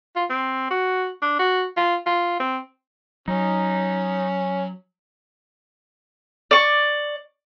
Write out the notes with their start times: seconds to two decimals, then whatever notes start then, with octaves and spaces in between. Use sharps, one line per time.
0.16 F4
0.30 C4
0.70 F#4
1.22 D4
1.39 F#4
1.77 F4
2.06 F4
2.40 C4
3.28 F#3 C#4 D#4
6.51 D5 C#6